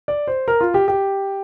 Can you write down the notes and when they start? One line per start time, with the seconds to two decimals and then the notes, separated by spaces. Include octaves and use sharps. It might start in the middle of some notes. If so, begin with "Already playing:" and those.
0.08 D5
0.27 C5
0.48 A#4
0.61 F4
0.74 G4
0.88 G4